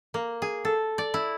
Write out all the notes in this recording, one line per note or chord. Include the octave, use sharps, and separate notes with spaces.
A#3
G#4
A4
D5
E4